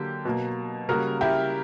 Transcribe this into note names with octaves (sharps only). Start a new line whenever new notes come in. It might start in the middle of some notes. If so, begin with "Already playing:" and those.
Already playing: D3 F#3 A#3 G4
B2 F#3 A#3
C#3 G3 A#3 F#4 A#4
E4 G4